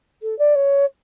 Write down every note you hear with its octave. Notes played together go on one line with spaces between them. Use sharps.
A4
D5
C#5